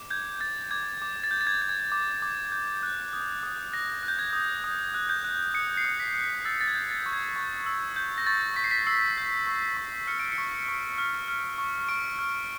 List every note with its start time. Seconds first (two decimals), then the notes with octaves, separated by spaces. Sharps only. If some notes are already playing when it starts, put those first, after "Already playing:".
Already playing: D6
0.10 G6 G#6
0.41 G6 A6
0.71 D6 G#6
1.02 D6
1.24 A6
1.31 G6
1.41 A6
1.47 G#6
1.62 G6
1.69 G#6
1.92 D6
2.22 D6
2.52 G6
2.83 F#6
3.13 D#6
3.43 D#6
3.73 F#6 A#6
4.03 F#6
4.08 G6
4.19 G#6
4.33 D#6
4.64 D#6
4.94 F#6
5.09 G6
5.24 F#6
5.54 D#6 C#7
5.77 C7
5.85 D#6
6.00 B6
6.15 F#6
6.45 E6 A6
6.61 A6
6.68 G#6
6.75 G6
6.91 A6
7.06 C#6
7.13 G#6
7.36 C#6
7.66 E6
7.96 G6
8.18 A#6
8.27 C#6 A6
8.56 C#6 B6
8.64 C7
8.71 B6
8.87 E6 C7
9.18 G6
9.47 C#6
9.77 C#6
10.07 F6 C#7
10.19 D7
10.32 C#7
10.38 C#6
10.69 C#6
10.98 F6
11.28 F6
11.58 C#6
11.89 C#6 D7
12.19 F6